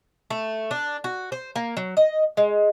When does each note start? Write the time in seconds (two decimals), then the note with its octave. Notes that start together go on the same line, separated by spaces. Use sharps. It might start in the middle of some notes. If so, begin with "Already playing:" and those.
0.30 A3
0.71 D4
1.04 F#4
1.32 C5
1.56 A#3
1.77 F#3
1.97 D#5
2.37 G#3